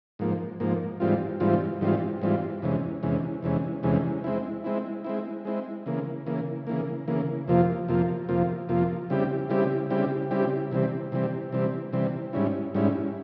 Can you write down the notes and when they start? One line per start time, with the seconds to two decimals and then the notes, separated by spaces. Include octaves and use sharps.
0.19 G#2 F3 A#3
0.60 G#2 F3 A#3
1.00 G#2 E3 G3 C4 F4
1.40 G#2 E3 G3 C4 F4
1.81 G#2 E3 G3 C4 F4
2.21 G#2 E3 G3 C4 F4
2.62 E2 C3 E3 G#3 C#4
3.03 E2 C3 E3 G#3 C#4
3.42 E2 C3 E3 G#3 C#4
3.83 E2 C3 E3 G#3 C#4
4.24 G#3 C4 E4
4.64 G#3 C4 E4
5.04 G#3 C4 E4
5.45 G#3 C4 E4
5.86 C#3 E3 A#3
6.26 C#3 E3 A#3
6.67 C#3 E3 A#3
7.08 C#3 E3 A#3
7.48 F2 C3 F3 A#3 F4
7.88 F2 C3 F3 A#3 F4
8.29 F2 C3 F3 A#3 F4
8.69 F2 C3 F3 A#3 F4
9.10 C#3 G3 C4 E4 G4
9.50 C#3 G3 C4 E4 G4
9.90 C#3 G3 C4 E4 G4
10.31 C#3 G3 C4 E4 G4
10.71 C3 E3 G3 C4
11.12 C3 E3 G3 C4
11.52 C3 E3 G3 C4
11.93 C3 E3 G3 C4
12.33 G#2 G3 C#4 E4
12.74 G#2 G3 C#4 E4